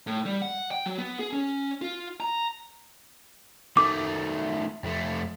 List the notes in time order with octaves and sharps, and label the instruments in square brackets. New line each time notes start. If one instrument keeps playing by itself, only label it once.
[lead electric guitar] A2
G3
F#5
G5
F#3
B3
G#4
C#4
F4
A#5
[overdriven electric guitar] D#3 A3 [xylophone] D6
[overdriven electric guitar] F2 A3